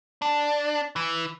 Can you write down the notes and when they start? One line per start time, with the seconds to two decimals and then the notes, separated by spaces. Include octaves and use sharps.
0.22 D4
0.96 E3